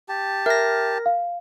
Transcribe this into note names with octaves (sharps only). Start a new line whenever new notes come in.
G4 A5
A#4 E5 A#6
F5